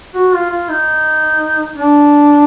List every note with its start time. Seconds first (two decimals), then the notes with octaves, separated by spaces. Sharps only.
0.14 F#4
0.33 F4
0.50 F4
0.69 D#4
1.77 D4